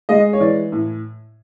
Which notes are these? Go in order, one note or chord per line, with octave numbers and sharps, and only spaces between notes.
G#3 D#5
C#5
E3 D5
A2